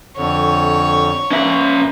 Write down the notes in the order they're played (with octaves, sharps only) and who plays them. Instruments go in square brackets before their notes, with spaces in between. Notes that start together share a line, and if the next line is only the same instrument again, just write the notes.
[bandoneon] F2 D3 [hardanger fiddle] C#5
[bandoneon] A#3 B4 [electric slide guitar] C#4 E5